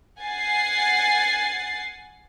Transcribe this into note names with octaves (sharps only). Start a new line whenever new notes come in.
F#5 G#5 A6 C7